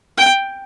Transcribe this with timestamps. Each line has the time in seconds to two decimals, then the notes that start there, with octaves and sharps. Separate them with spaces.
0.18 G5